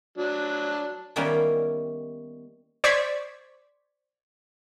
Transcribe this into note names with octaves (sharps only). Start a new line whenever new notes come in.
F#3 D4
D#3 G3 A#3 B3 C#4 E4
C5 D5 C#6 G#6 B6